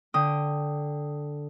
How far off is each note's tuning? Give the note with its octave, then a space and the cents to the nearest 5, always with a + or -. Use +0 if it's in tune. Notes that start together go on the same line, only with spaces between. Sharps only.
D3 +0 G5 +0 D#6 +0